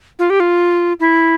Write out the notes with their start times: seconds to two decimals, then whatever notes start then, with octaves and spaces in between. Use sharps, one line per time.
0.19 F4
0.30 G4
0.40 F4
1.00 E4